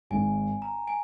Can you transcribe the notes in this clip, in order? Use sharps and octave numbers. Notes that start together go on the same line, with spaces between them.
G#1 G#2 D#3 G#5
A#5
G#5